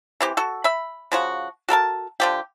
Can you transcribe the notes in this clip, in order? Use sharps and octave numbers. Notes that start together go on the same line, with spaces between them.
E3 C4 G4
F#4 A4
E5 B5
C#3 F3 F#4
F#4 A4 A#4 A5
D3 F3 G4